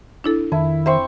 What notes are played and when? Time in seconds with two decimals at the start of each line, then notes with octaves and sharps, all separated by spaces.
0.24 D4 E4 A4
0.52 F2 D#3 E4
0.86 C4 C5 E5 C#6 E6